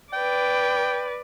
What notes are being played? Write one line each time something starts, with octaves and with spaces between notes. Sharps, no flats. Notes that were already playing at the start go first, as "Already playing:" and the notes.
B4 D5 G5